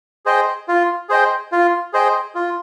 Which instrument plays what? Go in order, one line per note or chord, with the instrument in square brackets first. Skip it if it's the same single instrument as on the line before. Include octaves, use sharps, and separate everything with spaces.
[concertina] G#4 C5 D#5 G5
F4
G#4 C5 D#5 G5
F4
G#4 C5 D#5 G5
F4